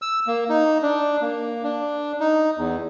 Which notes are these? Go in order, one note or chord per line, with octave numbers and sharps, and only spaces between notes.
E6
A#3
D#4
D4
A#3
D4
D#4
E2